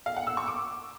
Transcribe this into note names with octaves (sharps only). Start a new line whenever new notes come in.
F5
F#5
E6
C#6
D6